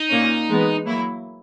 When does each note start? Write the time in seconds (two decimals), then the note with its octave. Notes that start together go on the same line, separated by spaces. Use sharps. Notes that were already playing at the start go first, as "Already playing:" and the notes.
Already playing: D#4
0.10 A#2 A#3 C#4
0.48 E3 G#3 B3
0.85 F#3 A#3 E4